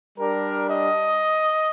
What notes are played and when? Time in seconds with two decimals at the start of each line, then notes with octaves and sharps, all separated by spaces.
0.17 G3 D4 G4 A#4
0.68 D#5